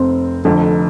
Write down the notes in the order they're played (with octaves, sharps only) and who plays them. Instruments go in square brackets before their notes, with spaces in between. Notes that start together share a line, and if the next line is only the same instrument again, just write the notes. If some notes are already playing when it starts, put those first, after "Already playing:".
Already playing: [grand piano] F1 [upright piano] C4
[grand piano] F1 F2 D3